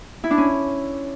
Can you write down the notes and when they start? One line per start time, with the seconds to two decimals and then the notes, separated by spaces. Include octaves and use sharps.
0.24 E4
0.31 D4
0.38 C#4